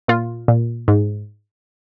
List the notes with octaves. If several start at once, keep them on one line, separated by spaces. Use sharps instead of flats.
A#2 F4
A#2
G#2